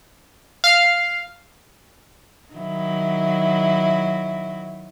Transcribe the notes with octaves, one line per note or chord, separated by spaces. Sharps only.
F5
D#3 F#3 E4